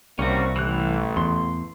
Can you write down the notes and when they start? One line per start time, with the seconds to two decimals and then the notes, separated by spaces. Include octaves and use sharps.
0.19 C2 C3 G3 A#3 C#4 F#4
0.56 A1 E3 F#6
1.17 E2 C6